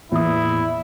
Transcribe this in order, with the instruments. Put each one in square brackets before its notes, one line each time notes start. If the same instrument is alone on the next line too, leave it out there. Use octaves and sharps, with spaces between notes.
[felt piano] E2 D#6 [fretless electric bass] A2 A#3 B3 [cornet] E4